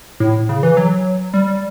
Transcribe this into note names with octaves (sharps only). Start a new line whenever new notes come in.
A2
C#3
E3
F#3
G3